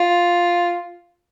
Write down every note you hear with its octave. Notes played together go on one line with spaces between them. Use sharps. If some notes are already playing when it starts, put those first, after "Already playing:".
Already playing: F4